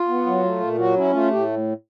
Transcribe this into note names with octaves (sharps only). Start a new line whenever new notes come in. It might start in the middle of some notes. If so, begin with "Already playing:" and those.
Already playing: F4
B3
F#3
A3
A#2
F#3 F#4
C#4 E4
A3 F4
A2 G4